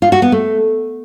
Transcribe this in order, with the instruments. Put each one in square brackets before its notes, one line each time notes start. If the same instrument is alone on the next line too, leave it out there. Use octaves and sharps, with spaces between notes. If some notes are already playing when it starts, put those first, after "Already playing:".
[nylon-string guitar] F4
F#4
B3
A3